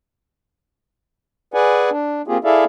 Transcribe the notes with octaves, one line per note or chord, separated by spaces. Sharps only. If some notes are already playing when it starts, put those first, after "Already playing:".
G#4 B4 D5 F#5 G#5
D4
A#3 C4 F4 G4 G#4
E4 G#4 A4 D5 E5 F5